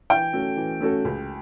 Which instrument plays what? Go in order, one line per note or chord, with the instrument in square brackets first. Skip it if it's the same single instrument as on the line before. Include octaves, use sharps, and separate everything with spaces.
[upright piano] E3 [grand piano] G5
[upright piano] A3 C#4 F#4 A4
E3
A3 C#4 F#4 A4
C#2